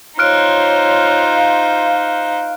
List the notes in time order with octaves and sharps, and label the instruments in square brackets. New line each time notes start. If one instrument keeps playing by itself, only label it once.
[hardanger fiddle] D#4 C5 [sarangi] F4 [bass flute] C#5 [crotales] F6 F#6 D7
[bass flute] F5